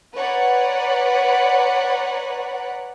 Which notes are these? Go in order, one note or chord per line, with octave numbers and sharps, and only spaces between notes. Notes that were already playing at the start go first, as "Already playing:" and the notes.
B4 C#5 D5 F#5 A#5 B5